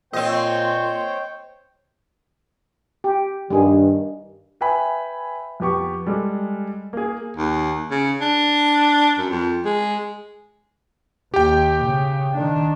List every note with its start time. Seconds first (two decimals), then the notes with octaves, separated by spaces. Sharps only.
0.13 A#2 C4 C5 C#5 D#5 G5
3.04 G4
3.50 G2 D#3 G3 G#4
4.61 B4 E5 G5 G#5 B5
5.60 F2 B3 G4 C#6
6.06 G3 G#3 A4
6.93 A#3 G#4
7.37 D#2
7.91 C#3
8.21 D4
9.18 F#2
9.30 F2
9.65 G#3
11.34 D#2 G4 G5
11.84 C#3
12.33 D#3 D4